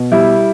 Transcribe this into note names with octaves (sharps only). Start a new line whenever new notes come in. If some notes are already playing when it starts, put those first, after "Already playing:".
Already playing: B2
G3 E4